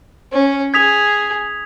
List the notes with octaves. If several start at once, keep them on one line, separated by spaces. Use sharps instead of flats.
C#4
G#4 D#6 G#6 B6 F7